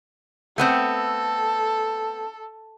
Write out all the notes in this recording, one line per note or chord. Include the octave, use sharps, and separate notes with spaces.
A3 B3 C4 A4